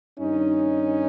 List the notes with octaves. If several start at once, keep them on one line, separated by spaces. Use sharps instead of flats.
G2 D#3 C#4 D#4